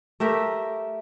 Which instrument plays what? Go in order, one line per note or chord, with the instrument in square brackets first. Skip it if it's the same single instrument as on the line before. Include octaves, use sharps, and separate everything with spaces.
[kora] A3 G4 A#4 E5